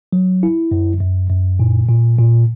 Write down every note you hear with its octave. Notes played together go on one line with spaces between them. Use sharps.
F#3
E4
F#2
F#2
F#2
A#2
A#2
A#2